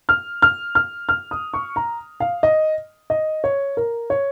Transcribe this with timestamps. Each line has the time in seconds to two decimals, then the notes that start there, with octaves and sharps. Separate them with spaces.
0.09 F6
0.42 F6
0.75 F6
1.09 F6
1.31 D#6
1.54 C#6
1.76 A#5
2.20 F5
2.43 D#5
3.10 D#5
3.44 C#5
3.77 A#4
4.10 C#5